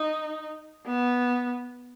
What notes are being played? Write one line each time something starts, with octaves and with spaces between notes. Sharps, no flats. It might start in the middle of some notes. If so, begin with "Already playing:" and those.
Already playing: D#4
B3